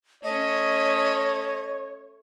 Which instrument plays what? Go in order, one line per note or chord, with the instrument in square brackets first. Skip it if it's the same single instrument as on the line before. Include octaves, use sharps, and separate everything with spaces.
[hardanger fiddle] A3 C#4 [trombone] C#5 [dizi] D#5